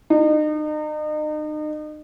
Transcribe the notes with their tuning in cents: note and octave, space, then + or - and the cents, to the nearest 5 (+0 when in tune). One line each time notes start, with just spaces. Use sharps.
D#4 -35